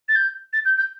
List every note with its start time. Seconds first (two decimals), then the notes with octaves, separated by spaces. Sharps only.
0.08 A6
0.15 G6
0.53 A6
0.65 G6
0.77 G6